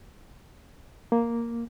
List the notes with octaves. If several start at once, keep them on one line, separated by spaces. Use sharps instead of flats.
A#3